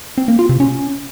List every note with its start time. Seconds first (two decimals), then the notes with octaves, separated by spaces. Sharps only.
0.18 C4
0.28 A#3
0.39 F4
0.49 C3
0.60 C#4